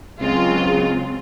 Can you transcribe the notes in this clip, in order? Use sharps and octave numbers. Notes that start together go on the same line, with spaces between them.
C#2 F#3 G#3 C4 F4